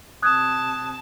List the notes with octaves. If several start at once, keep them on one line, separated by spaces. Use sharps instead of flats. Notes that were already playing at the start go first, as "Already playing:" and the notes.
C3 A5 D#6 F#6 G#6